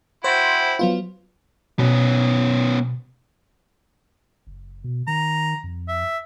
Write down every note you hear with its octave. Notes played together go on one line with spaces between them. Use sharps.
E4 F#4 C5 G5
F#3 B3 F4
B2 B3 C#4
F#1
B2
D#3 A#5
F2
E5